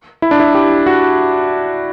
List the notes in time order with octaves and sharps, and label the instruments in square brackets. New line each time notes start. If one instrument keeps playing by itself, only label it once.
[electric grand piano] E4
D4
E4
G4
F#4